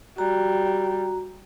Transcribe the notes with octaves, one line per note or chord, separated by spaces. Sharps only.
G3 F#4 A#5